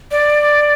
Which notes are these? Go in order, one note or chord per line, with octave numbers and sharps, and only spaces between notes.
D5